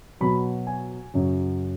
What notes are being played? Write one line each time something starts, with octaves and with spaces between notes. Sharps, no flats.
B2 F#3 B5
G#5
F#2 C#3 F#3